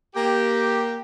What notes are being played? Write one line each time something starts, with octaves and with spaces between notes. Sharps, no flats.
A#3 G4